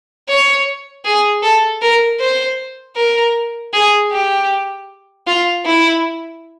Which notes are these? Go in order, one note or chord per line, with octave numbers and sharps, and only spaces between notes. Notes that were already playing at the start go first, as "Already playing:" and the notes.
C#5
G#4
A4
A#4
C5
A#4
G#4
G4
F4
E4